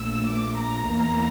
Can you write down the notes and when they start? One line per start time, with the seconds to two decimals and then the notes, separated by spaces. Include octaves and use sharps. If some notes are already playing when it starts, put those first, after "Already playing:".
Already playing: A#1 A#2 A3 E6
0.30 D6
0.59 A#5
0.88 E2 E3 A#3